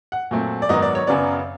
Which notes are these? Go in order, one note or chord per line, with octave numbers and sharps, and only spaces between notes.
F#5
A#2 F#3 A3 C4
D5
G#2 D#3 F#3 B3 D#5
D5
C#5
F#2 C#3 F#3 B3 D5